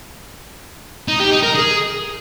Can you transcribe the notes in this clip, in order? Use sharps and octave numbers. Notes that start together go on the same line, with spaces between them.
D#4
G4
D#4
A#4
G#4